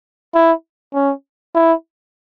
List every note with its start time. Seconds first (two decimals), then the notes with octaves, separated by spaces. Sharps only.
0.34 E4
0.94 C#4
1.55 E4